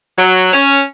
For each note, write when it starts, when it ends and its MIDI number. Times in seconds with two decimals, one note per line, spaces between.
0.17 0.49 54
0.53 0.81 61